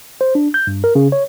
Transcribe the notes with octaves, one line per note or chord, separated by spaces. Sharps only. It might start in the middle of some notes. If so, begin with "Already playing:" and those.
C5
D4
G6
G2
A#4
C#3
C#5